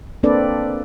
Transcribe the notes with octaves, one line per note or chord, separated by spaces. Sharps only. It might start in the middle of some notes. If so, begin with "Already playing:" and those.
A#3 C4 D4 A4 B4 D5